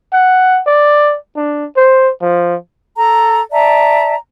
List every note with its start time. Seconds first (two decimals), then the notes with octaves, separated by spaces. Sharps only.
0.13 F#5
0.66 D5
1.36 D4
1.76 C5
2.22 F3
2.97 A4 A#5
3.51 D5 E5 A5 A#5